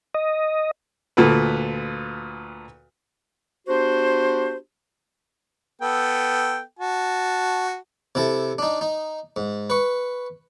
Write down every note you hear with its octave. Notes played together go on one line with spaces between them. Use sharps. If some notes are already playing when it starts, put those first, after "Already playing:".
D#5
D2 A#2 A4 B4
B3 D4 F#4 G4 C5
B3 A4 G5
F#4 A5
C3 E4 A4
D4 D#4
D#4
G#2
B4 C#6